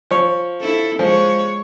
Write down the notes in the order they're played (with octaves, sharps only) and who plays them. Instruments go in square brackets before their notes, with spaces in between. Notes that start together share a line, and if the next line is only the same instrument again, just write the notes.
[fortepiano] F3 C#5
[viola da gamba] E4 A4
[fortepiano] F3 [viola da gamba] G#3 C#5